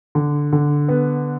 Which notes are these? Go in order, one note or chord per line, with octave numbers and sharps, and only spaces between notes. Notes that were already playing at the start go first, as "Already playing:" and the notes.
D3
D3
B3